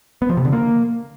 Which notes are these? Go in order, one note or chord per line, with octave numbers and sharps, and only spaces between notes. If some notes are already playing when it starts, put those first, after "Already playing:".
B3
F3
C3
D3
A#3